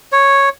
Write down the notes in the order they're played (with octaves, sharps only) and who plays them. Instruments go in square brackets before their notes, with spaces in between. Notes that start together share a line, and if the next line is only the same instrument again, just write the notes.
[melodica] C#5